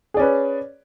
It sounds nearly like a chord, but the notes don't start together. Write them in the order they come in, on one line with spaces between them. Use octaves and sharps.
G#4 D5 C#4 B4